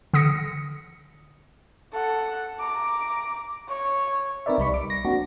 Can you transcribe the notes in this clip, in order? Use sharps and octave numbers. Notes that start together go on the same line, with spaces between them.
D3 D#6 A#6 C#7
A4 F#5
A#5 D6
C#5
C4 D#4 A#4 B4 D5 E5
C2 G3 B5 C#6
D6
A#6
A#3 C4 D4 F#4